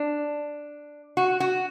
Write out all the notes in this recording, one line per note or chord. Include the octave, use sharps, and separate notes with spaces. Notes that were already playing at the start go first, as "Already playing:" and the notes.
Already playing: D4
F#4
F#4